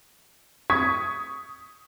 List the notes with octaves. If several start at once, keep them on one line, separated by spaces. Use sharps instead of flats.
C#6 D#6 G#6 B6